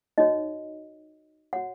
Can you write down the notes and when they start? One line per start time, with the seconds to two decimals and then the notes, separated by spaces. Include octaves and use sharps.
0.18 D#4 F#4 C#5 D#5
1.53 F#4 C#5 F#5